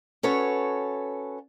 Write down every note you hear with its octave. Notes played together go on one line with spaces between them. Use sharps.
C#4 F#4 A4 B4 C#5